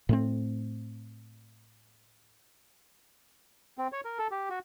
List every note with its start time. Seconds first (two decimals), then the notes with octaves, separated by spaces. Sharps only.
0.09 A2 A3 C4
3.78 C4
3.92 C#5
4.05 A#4
4.18 A4
4.31 G4
4.50 F#4